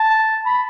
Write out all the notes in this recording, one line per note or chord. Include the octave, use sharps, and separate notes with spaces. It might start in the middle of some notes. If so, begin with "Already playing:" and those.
Already playing: A5
B5